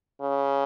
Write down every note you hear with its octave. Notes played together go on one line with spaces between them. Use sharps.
C#3